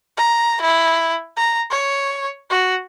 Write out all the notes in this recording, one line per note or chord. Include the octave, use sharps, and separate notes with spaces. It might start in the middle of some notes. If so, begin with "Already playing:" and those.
A#5
E4
A#5
C#5
F#4